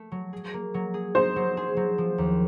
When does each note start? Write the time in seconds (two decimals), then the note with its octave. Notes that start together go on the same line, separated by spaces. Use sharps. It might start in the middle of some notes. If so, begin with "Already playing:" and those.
Already playing: A3
0.12 F#3
0.33 G#4
0.54 A#3
0.74 F#3
0.94 G#4
1.15 D#4 C5
1.36 F#3
1.57 G#4
1.77 F#3
1.98 F3
2.18 D#2